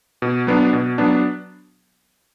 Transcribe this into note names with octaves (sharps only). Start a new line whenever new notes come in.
B2
F#3 B3 D4
B2
F#3 B3 D4